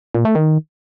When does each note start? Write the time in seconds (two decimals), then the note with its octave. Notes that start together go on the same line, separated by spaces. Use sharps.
0.15 A#2
0.25 A3
0.35 D#3